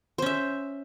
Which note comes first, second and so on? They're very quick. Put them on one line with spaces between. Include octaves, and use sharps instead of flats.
C5 C#4 E5